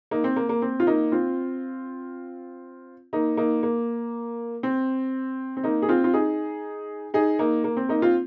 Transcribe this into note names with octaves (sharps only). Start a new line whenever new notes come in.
A#3 D#4
C4
A#3
A#3
C4
F4
A#3 D#4
C4 F4
A#3 D#4
A#3 D#4
A#3
C4
C4
A#3 D#4
G#4
C4 F4
F4
D#4 G#4
D#4 G#4
A#3 D#4
A#3
C4
A#3 D#4
C4 F4